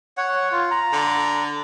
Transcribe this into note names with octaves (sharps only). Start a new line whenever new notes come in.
C#5 F#5
F4
A#5
D3